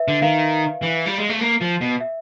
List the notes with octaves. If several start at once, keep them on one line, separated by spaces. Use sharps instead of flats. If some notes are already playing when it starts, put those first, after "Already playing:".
Already playing: B4 E5
D3
D#3 F5
E3
G3
G#3
A3
A#3
F3
B2
E5